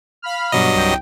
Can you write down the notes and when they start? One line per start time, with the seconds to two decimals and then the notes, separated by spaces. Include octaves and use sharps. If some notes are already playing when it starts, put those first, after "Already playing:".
0.22 F5 B5 F6
0.52 G2 B2 F#3 D#5
0.74 C2 G5